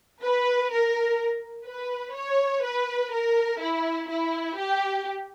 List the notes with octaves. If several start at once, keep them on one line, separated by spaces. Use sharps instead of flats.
B4
A#4
B4
C#5
B4
A#4
E4
E4
G4